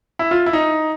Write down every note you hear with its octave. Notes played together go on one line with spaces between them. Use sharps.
E4
F4
E4
D#4